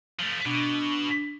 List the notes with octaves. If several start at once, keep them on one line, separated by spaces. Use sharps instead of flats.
F3 A3
B2 D4